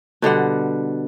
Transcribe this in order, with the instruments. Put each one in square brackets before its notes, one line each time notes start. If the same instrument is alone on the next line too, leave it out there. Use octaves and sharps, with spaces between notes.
[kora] B2 D3 G3 F#5